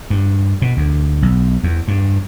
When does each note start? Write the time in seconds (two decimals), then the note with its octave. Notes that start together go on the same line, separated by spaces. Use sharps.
0.10 G2
0.62 B2
0.77 D2
1.22 B1
1.63 E2
1.88 G2